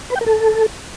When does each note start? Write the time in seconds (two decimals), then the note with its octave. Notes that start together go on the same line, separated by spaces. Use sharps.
0.10 B4
0.15 G5
0.21 A#4
0.26 A4